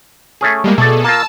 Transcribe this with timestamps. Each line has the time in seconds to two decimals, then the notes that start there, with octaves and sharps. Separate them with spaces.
0.41 A3 C#4 G#4
0.64 G3 G#3 A#3
0.78 B2 A3 G#4 A4 D5
1.04 A#3 F4 A5 E6